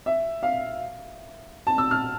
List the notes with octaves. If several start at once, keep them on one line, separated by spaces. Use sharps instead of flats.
E5
F5
A5
E6
F6